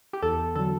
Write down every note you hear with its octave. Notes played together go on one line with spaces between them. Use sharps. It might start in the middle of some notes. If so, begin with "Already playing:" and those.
G4
E2 A4
D3 F#3 A4